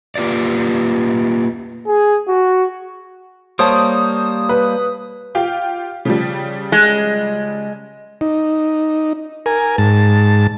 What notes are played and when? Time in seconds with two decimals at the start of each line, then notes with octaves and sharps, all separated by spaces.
0.15 A#3 F4 G4 B4 D5
1.87 G#4
2.28 F#4
3.59 G3 A#3 C5 C#5 A5 D#6
4.49 B4
5.35 F4 G4 F5
6.05 C#3 F3 G3
6.72 G#3
8.21 D#4
9.46 A#4 G#5
9.78 G#2 A5